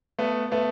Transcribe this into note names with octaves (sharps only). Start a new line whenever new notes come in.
A3 B3
A3 B3